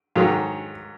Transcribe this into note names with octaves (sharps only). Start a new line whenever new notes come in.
G#2 D#3 F#3 F5